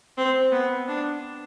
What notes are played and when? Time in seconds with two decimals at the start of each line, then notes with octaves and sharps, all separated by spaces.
0.17 C4
0.52 B3
0.88 D4